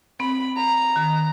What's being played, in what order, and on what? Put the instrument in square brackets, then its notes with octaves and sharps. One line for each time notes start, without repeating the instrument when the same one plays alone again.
[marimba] C4 [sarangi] B5
[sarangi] A#5
[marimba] D#3